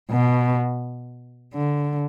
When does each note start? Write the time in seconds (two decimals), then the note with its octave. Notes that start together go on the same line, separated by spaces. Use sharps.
0.10 B2
1.54 D3